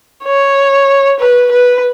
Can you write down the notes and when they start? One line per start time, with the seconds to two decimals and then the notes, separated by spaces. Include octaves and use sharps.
0.24 C#5
1.20 B4
1.51 B4